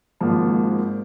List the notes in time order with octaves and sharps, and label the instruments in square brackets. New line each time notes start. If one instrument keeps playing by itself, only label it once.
[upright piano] G#1 G#2 F3 A#3